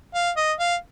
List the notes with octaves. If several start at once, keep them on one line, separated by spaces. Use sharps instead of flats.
F5
D#5
F5